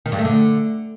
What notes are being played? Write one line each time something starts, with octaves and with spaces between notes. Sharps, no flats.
D#3
G2
A3
D3